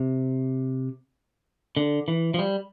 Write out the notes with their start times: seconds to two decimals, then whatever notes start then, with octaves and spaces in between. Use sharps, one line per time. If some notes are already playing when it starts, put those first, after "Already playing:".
Already playing: C3
1.77 D3
2.08 E3
2.34 F3
2.39 G3